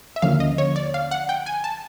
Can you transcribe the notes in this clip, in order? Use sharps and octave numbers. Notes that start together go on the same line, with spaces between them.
E5
D#2 D3 F3 A#3 C#4 F5
D#5
C#5
D5
F5
F#5
G5
G#5
A5